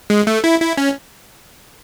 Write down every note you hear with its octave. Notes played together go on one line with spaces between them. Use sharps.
G#3
A3
E4
E4
C#4